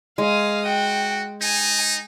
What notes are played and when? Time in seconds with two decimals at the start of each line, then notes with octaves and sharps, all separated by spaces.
0.18 G#3 F5 D#6
0.66 F#4 G5
1.42 D#4 G#5